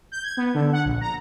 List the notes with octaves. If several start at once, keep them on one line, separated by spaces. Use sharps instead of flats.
G6
G#6
B3
D3
F#5
A#1
A#5